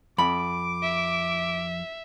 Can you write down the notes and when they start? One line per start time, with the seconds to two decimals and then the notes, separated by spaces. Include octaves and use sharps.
0.18 F2 B5 D6
0.83 E5